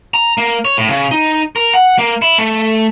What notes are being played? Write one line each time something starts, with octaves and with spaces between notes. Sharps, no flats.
A#5
A#3
C#5
A2
C#3
D#4
A#4
F#5
A#3
E4
A3